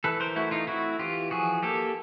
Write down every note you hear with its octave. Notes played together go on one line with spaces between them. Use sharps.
E3 A4 B4
A#4 C5
A3 E4 F#4
D#4 F4
C4 E4 F#4
E3 F4 G4
F3 F#4 G#4
A#3 G4 A4